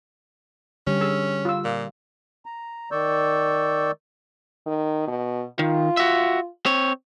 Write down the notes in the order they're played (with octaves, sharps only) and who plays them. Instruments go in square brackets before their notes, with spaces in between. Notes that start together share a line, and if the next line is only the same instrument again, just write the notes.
[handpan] D3 G3 G4 [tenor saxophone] C#4
[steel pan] G#4 E6
F4 E6
[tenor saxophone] A#2
[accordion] A#5
D#3 D5 C#6 E6 G6
[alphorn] D#3
B2
[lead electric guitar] D#3 [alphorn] F4
[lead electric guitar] F#4 E5
C4 C#5